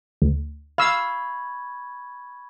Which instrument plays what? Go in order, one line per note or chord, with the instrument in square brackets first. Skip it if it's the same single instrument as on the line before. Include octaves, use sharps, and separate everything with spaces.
[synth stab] D2
[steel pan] F5 E6 [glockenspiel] B5 C#6 G#6